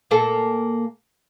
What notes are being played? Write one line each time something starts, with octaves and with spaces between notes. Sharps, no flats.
A#2 A#3 A4